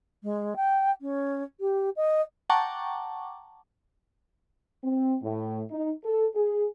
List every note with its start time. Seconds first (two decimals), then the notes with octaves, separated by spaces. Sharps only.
0.23 G#3
0.56 G5
1.01 C#4
1.60 G4
1.96 D#5
2.50 F#5 G5 A5 A#5 C#6 D6
4.84 C4
5.22 A2
5.71 D#4
6.04 A4
6.35 G#4